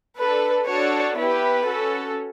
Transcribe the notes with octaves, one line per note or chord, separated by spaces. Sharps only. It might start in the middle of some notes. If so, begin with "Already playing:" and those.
D4 A4 B4
D4 F#4 A4 C#5
B3 E4 G4 B4
C#4 F#4 A4